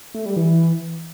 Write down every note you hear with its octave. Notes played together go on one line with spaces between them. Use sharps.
A3
G3
E3